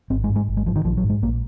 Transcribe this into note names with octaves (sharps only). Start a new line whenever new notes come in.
G#1 C4
G#3
G#2
G#3
G#1
G#3
G#2 F3
D#3
A#1 F3
F#3
G#2
G#3
A#1 A#3